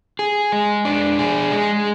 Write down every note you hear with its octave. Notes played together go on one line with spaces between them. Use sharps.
G#4
G#3
D4
G#4
G#3